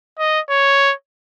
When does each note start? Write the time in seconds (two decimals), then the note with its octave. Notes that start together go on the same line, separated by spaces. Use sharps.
0.18 D#5
0.50 C#5